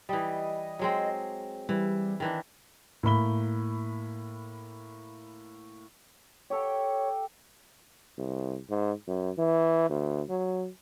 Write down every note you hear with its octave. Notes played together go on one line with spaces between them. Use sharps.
E3 G3 D#5
F#3 G#3 C4
E3 G3
D#3 E3 D4
A2 A#3 B5 G7
G4 A4 C#5 G5
C2
G#2
F#2
E3
D2
F#3